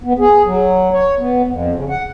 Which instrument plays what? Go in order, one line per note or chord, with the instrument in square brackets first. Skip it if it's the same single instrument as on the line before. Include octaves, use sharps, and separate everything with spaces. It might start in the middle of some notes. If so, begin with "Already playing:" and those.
[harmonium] B3
G#4
F#3
C#5
B3
F2
C#3
F#5